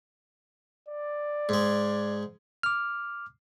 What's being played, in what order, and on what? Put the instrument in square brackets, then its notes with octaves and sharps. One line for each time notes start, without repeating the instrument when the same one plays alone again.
[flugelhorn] D5
[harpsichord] G#2 G#3
[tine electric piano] D6 F6